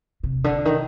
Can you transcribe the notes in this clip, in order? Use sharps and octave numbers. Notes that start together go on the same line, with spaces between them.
C3
D3
D#3